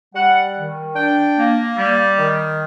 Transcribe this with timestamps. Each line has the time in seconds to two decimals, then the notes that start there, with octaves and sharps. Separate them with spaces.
0.14 G3 F#5
0.56 D#3
0.95 D4 G5
1.37 A#3
1.77 G3
2.18 D#3